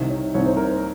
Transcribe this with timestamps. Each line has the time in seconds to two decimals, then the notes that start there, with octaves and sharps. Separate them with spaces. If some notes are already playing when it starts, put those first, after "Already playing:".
Already playing: C2 C3 D#3
0.10 C#5
0.34 C2 C3 D#3 C#5
0.46 C5
0.57 A#4
0.69 C5